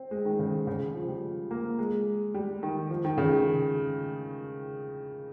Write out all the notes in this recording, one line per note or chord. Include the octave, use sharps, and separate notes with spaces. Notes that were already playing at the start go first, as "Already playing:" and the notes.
Already playing: C4
G#3
D#3
C#3
D#3
C#3
F3
G3
A#3
G#3
G3
D#3
F3
D#3
C#3
D#3